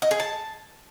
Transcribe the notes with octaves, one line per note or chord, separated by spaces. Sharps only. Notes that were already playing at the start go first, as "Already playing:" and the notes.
D#5
G#4
A5